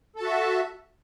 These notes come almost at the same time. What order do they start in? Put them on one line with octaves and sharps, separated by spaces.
A4 A5 F#4 E5